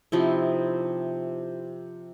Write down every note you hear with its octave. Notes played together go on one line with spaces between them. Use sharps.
C3 F3 D#4 E4